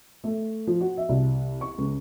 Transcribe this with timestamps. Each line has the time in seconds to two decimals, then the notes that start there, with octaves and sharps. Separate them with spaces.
0.24 A3
0.67 F3
0.81 F#4
0.98 E5
1.09 C2
1.61 C#6
1.78 C#2